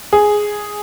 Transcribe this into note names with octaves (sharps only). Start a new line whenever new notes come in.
G#4